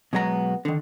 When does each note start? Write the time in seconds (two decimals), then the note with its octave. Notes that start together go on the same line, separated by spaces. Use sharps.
0.13 B2 F#3 G#3 B3 A#5
0.65 D3 D#3